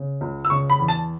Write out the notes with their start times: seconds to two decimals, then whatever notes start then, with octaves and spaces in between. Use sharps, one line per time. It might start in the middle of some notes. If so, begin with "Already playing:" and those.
Already playing: C#3
0.21 C#2
0.45 E6
0.50 C#3 C#6
0.70 B5
0.79 E2
0.88 A5